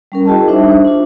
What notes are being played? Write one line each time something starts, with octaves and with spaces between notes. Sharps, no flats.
G3 C#4 A#4
E4 F#4 G#4 D#5 G5 A5
G3 D4 D#4 C5 E5
C5
D4 F4